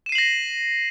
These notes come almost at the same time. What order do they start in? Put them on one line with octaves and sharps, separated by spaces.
E7 D#7 C7 F#7 A#6